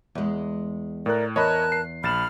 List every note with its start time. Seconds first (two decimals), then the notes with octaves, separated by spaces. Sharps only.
0.15 E2 G#3
1.06 A2 A#4 D5 F#6
1.36 E2 A#4 C#5 D#5 A5 B5 F#6
1.72 C7
2.03 A#1 B5 F6 A6 E7